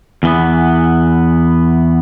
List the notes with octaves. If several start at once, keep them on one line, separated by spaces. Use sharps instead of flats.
E2 E3 B3